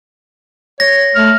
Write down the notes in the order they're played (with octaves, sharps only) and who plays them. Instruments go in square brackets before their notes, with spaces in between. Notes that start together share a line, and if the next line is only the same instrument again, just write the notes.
[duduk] C#5 [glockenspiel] A#6
[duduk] A3 [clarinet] F6